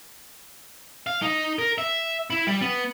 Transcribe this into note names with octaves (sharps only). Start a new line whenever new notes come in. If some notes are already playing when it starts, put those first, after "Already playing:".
F5
D#4
A#4
E5
E4
G3
B3